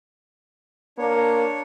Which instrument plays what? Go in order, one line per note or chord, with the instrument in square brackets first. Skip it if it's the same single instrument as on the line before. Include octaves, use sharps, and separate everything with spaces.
[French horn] A#3 [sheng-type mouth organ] D4 C#5